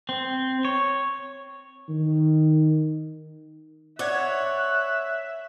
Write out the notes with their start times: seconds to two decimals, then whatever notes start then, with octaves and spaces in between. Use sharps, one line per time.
0.09 C4
0.65 C#5
1.89 D#3
3.99 C#5 D5 E5 F#5 F#6 G#6